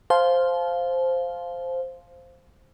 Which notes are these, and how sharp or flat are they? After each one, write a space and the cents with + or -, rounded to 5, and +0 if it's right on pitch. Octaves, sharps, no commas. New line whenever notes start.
C5 +0 F5 +0 A5 -35